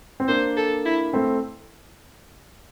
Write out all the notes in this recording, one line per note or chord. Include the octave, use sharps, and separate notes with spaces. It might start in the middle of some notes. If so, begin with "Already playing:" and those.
C4
A#3 D4 C5
A4
E4
A3 C4